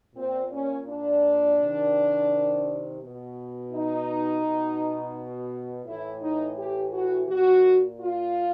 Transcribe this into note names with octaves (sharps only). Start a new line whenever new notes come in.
A#2 C4
C#4
D4
C3 D#3
B2
D#4
B2
A2 E3 E4
D#4
G4
F#4
A#2 F#4
F4